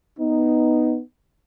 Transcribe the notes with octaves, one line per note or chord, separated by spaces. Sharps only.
B3 D#4